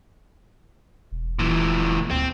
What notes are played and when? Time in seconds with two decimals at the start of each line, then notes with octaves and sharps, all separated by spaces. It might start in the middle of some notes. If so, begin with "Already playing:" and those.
1.12 E1
1.39 A#2 E3
2.10 D2 C4